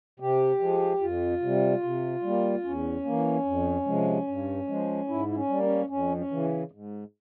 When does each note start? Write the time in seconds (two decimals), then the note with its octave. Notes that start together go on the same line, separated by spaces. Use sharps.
0.20 C3 G4
0.60 F3 G#3
1.01 F2 F4
1.41 C3 G3
1.83 C3
2.23 G3 A#3
2.64 E2 C#4
3.05 E3 A#3
3.45 F2
3.86 C3 F3 G#3
4.27 G2
4.68 F3 G#3
5.08 G#2 E4
5.28 E4
5.35 C#4
5.49 G3 A#3
5.63 C#4
5.89 F2 C#4
6.17 C#4
6.31 C#3 E3
6.71 G#2